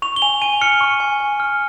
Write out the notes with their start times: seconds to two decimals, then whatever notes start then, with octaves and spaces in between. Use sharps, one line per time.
0.02 C#6 F7
0.16 G7
0.22 G#5 F7
0.42 G#5 D#7
0.61 F6 C#7
0.81 C#6
1.00 G#5
1.20 G#5
1.40 F6